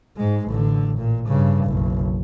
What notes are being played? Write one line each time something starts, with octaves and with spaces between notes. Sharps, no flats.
G#2 G#3
A1 D3
A#2
G2 C#3
F#1 B1